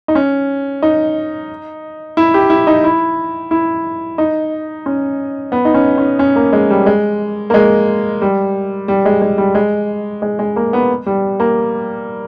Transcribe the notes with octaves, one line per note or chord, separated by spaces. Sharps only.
D#4
C#4
D#4
E4
G4
E4
D#4
E4
E4
D#4
C#4
B3
D#4
C#4
C#4
C#4
A#3
G#3
G3
G#3
A#3
G#3
G3
G3
G#3
G#3
G3
G#3
G#3
G#3
A#3
B3
G3
A#3